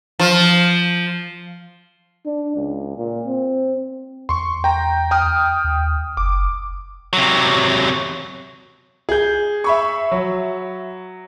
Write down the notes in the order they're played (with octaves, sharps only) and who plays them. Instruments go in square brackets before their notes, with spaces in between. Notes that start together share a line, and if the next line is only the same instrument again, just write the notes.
[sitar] F3
[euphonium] D4
C#2
A#2
C4
[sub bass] E2 [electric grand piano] C6 C#6
[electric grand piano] G5 A#5
G5 D#6 F6
[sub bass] D#2
[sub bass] F#1 [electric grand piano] D6
[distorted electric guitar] C3 F#3
[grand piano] G#4 G6
[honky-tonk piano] E5 B5 C#6
[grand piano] F#3